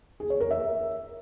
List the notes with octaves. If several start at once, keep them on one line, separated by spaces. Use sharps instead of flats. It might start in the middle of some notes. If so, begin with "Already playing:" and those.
G#4
C#5
A#4
E5